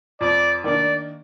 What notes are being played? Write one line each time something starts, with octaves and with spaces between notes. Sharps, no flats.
F2 D5
D#3 A#3 D4 D5